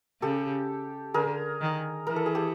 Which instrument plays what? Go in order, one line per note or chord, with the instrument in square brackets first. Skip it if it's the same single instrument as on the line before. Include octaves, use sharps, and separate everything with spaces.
[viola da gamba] C#3 [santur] G4 A4
[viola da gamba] D3 [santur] G#4 A#4
[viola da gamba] D#3
[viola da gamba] E3 [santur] A#4
[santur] A4
G#4
G4 A4